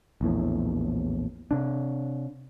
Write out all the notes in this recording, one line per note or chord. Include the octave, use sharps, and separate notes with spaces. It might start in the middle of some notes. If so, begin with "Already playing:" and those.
A#1 E2 A2
C3 D4